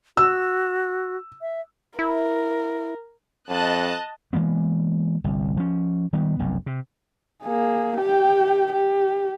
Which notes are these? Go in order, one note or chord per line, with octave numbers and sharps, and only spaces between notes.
F#4 E6
E5
E4 A#4
F2 D#5 A5 F#6
E3 G#3 A#3 B3
G1 C2
F3 C#4
D#3 G3 B3
F1 B1 F#2
C3
A#3 G#4
G4 G5
G4